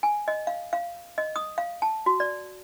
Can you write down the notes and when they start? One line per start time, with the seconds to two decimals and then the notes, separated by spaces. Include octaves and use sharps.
0.03 G#5
0.28 D#5
0.47 F5
0.73 F5
1.18 D#5
1.36 D#6
1.58 F5
1.82 A5
2.06 F#4
2.20 D5